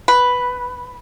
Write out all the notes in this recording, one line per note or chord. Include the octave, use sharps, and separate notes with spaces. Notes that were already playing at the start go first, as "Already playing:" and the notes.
B4